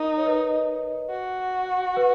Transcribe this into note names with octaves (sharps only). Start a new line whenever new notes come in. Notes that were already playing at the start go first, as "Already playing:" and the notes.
Already playing: D#4 A#4
C#5
B4 D#5
F#4
B4